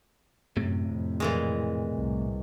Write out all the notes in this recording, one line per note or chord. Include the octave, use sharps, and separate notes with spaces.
F#2 A2 C3
F2
A#2 E3 G#3
C2